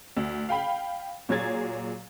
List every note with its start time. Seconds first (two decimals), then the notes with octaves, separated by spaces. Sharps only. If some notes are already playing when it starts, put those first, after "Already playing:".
0.17 D2
0.49 F5 G5 B5
1.29 A#2 F#3 G#4 G#6 A6